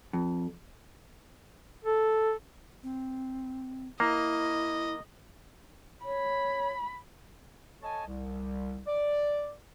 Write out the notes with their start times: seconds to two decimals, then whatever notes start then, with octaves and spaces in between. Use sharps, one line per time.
0.13 F2
1.85 A4
2.83 C4
4.00 A#3 E4 D#5
6.05 C#5 B5
7.83 A4 C#5 D#5 G#5 A5
8.07 C2
8.87 D5